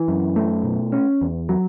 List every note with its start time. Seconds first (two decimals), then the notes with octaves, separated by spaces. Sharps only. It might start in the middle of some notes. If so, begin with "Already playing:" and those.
Already playing: E3
0.08 F#2
0.36 A3
0.64 B2
0.92 C#4
1.22 E2
1.49 F#3